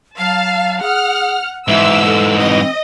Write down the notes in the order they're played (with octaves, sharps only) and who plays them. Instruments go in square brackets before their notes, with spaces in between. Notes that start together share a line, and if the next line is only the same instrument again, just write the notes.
[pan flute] F#3 [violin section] F5 A5
[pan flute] G#4 [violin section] F#5 F6
[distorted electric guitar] G#2 E3 [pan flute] E5 [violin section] E6
[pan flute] A4
[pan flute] C4 [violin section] D#5